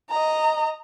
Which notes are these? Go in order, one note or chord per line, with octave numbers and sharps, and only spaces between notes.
D#5 A#5